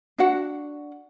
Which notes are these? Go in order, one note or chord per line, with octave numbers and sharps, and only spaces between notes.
D4 F#4 F#5